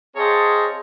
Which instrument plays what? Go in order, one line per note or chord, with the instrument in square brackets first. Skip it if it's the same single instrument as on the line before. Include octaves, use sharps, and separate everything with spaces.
[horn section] C4 G#4 C#5 D#5 F5 A5